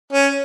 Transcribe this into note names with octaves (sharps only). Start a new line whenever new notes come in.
C#4